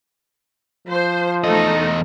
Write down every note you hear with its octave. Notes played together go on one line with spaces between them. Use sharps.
F3 C5
E2 A3 D#4 A4 D#5